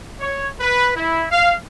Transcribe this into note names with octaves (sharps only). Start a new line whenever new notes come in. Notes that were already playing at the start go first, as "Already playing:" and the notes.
C#5
B4
E4
F5